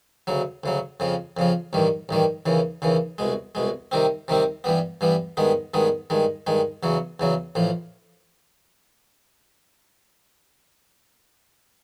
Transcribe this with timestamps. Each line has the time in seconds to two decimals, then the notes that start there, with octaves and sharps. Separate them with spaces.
0.27 D2 C#3 F#3
0.64 D2 C#3 F#3
1.00 F2 C#3 F3
1.37 F2 C#3 F3
1.73 A1 G2 D#3 G3
2.09 A1 G2 D#3 G3
2.46 D#2 C#3 E3
2.82 D#2 C#3 E3
3.18 C2 B2 G#3
3.55 C2 B2 G#3
3.92 C3 D#3 G3 C4
4.28 C3 D#3 G3 C4
4.64 G2 E3 G3 B3
5.01 G2 E3 G3 B3
5.37 G2 D#3 G#3 B3
5.74 G2 D#3 G#3 B3
6.10 G2 D#3 G#3
6.47 G2 D#3 G#3
6.83 E2 C#3 F#3
7.20 E2 C#3 F#3
7.55 A1 A2 F3